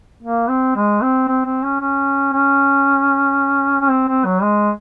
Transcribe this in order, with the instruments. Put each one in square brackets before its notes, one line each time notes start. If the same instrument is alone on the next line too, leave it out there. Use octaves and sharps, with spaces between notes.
[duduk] A#3
C4
G#3
C4
C4
C4
C#4
C#4
C#4
C#4
C4
C4
F#3
G#3